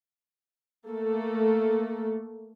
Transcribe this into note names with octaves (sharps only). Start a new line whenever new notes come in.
A3 A#3 A4